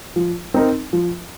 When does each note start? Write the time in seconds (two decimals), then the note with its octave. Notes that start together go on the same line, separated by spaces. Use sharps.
0.16 F3
0.54 C4 D#4 A#4
0.93 F3